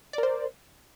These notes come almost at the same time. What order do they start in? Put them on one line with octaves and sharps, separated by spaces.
D5 A#4 C5